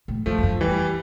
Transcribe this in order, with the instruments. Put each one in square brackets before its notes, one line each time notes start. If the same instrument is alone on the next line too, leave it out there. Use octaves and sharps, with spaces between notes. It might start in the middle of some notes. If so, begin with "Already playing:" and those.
[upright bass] A2
[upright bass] G2 [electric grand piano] F3 A3
[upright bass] G2
F2
[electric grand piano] E3 G3